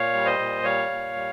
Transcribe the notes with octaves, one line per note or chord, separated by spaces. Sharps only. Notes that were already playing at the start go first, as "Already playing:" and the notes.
Already playing: A#2 C#5 F5
G3
C5 D#5
A#2
G3 C#5 F5
A#2
G3